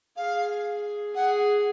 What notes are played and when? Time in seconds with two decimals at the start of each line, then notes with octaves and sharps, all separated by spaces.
0.17 G#4 F5
1.15 G#4 F#5